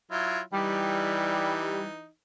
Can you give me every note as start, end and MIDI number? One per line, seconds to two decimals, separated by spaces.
0.11 0.40 54
0.11 0.40 64
0.11 0.40 65
0.53 2.08 52
0.53 1.85 55
0.53 2.08 63